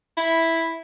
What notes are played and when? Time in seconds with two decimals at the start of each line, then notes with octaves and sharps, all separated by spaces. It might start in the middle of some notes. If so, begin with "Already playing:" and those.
0.17 E4